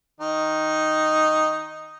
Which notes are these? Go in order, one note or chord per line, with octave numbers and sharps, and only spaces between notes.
D#3 D#4